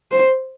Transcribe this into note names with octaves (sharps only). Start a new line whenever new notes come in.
C5